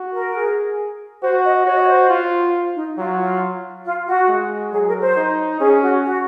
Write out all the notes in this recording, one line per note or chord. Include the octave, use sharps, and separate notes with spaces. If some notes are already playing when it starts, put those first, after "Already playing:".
Already playing: F#4
A#4
G#4
F#4 C5
D#5
F#4 C#5
D#5
C#5
C5
F4
D#4
F#3 F4
F4
F4
F#4
G#3
F#3 G#4
A#4
C5
D#4
C#4 G#4
F#4
F#4